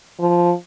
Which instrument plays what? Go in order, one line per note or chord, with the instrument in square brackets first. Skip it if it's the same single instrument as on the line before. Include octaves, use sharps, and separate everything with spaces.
[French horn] F3